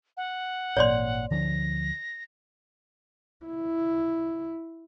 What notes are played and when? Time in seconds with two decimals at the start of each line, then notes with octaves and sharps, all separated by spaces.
0.17 F#5
0.77 G#1 A#2 C#5 D5 C6
1.31 D2 D3 F3 A#6
3.45 E4